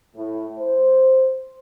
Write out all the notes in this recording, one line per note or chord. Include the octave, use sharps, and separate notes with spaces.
A2
C5